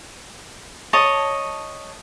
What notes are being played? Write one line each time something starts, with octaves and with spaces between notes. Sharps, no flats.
C#5 D#5 A5